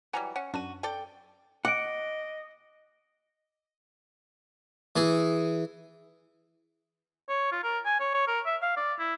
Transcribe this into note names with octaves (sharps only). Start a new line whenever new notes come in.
E3 F#3 G3 F#5 G#5 A#5
C#4 F#5
F#2 D4 F#4 D#7
A4 D5 G5
D#5 F#5 D6 D7
E3 G#4
C#5
F4
A#4
G#5
C#5
C#5
A#4
E5
F5
D5
E4